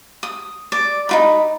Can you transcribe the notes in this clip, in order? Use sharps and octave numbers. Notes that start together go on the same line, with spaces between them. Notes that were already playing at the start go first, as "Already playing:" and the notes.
D#6
D5
D#4 F4 B5